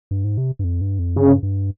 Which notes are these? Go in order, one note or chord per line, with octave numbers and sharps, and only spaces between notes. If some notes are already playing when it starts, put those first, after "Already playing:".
G2
G#2
C3
G2
F2
G2
F2
G2 C#3
G2